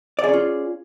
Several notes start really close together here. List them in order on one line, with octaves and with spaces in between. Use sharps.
D5 G#4 C#4 F4